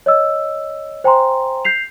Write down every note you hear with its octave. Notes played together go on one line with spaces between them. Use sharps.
C#5 D#5 E6
C5 G5 G#5 A#5 C6
G6 B6 C7 F7